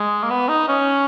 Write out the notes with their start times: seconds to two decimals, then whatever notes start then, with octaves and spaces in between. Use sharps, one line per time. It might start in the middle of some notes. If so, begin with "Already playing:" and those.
Already playing: G#3
0.23 A#3
0.30 B3
0.49 D#4
0.68 C#4